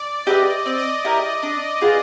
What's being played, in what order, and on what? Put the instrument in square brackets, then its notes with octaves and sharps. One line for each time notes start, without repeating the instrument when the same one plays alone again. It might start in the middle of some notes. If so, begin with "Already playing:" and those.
Already playing: [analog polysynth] D5
[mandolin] G4 B4 E5 [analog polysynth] D#5
[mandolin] C4 [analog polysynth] D5
[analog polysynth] D#5
D5
[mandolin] E4 G4 A#4
D4
F4 G#4 B4